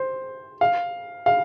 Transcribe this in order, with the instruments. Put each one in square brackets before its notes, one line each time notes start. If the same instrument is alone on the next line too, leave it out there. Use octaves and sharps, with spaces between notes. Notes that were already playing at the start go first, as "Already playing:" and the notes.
Already playing: [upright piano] C5
F5
F5